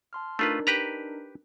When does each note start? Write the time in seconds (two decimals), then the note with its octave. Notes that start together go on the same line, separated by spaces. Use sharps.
0.13 A5 C6 F6
0.39 A3 D4 D#4 F4 A#4 B4
0.67 G4 B4 A#5